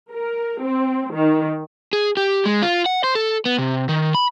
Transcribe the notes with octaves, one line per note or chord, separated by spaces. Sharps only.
A#4
C4
D#3
G#4
G4
G#3
F4
F#5
C5
A4
B3
C3
D#3
B5